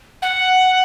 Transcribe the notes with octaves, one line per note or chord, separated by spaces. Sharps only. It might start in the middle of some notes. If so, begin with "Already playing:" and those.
F#5